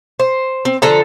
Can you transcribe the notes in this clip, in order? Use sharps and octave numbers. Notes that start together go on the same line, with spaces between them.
C5
C4
D3 F3 A4 A#5